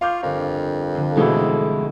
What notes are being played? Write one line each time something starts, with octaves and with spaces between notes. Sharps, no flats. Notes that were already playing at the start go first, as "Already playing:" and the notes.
F4 F5 C#6 D6 G6
G1 F2 A#4
D3 F3 C4
B2 E3 G#3 A3 E4